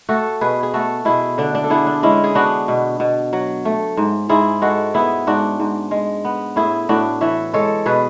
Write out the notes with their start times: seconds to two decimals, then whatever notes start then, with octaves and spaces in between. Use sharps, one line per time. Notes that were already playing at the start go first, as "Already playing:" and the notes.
0.09 A3 F#4 A4
0.41 B2 G#4 B4
0.63 G#4
0.74 A3 F#4 A4
1.05 B2 E4 G#4
1.38 D3 D4
1.55 D4
1.64 A4
1.70 D3 E4 G#4
1.87 D4
2.03 G#3 C#4 E4
2.24 G#4
2.35 B3 D4 F#4
2.68 B2
3.00 B2
3.33 F#3
3.65 A3
3.97 G#2
4.29 G#2 E4 G#4
4.62 G#3 F#4 A4
4.94 B3 E4 G#4
5.27 G#2 D4 F#4
5.60 G#2
5.91 G#3
6.25 B3
6.56 A2 E4 G#4
6.89 A2 D4 F#4
7.21 E3 C#5 E5
7.53 G#3 A4 C#5
7.86 B2 G#4 B4